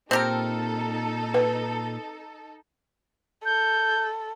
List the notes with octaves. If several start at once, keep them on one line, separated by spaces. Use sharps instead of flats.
A#2 C4 D#4 G4 A4 A#4
B4
A4 G6